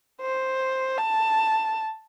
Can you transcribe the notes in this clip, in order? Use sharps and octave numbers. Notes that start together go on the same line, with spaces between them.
C5
A5